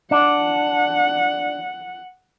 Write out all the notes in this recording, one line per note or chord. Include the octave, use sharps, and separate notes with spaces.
D4 F#5